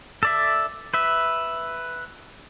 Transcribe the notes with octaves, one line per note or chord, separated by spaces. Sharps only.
A4 D5 E5
B4 E5